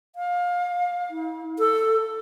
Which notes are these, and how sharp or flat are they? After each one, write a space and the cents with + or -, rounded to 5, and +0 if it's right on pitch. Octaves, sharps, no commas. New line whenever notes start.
F5 +25
E4 -45
A4 +10